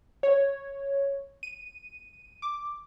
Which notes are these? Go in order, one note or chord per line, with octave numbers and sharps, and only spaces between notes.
C#5
D#7
D6